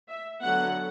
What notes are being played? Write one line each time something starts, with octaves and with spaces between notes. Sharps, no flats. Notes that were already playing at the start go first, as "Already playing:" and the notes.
E5
D3 F#3 B3 F#5